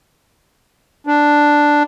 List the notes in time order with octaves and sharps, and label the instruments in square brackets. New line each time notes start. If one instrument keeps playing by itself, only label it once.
[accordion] D4